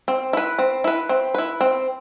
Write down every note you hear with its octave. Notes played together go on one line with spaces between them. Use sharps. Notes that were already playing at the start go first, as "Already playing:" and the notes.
C4
E4 B4
C4
E4 B4
C4
E4 B4
C4